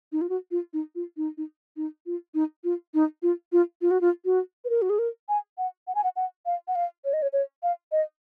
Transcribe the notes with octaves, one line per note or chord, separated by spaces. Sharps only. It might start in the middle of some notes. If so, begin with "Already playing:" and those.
D#4
F4
F#4
F4
D#4
F4
D#4
D#4
D#4
F4
D#4
F4
D#4
F4
F4
F4
F#4
F4
F#4
B4
A#4
F#4
G#4
A#4
G#5
F#5
F#5
G#5
F#5
F#5
F5
F#5
F5
C#5
D#5
C#5
C#5
F5
D#5